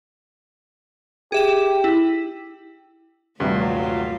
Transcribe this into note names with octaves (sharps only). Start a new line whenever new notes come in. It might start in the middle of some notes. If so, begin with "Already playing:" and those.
G4 G#4 E5 E7
E4
D#1 G2 C3 F#3 A3 F4 E5